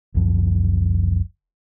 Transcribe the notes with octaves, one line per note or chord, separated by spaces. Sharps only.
F#1 C#2 F#2 F3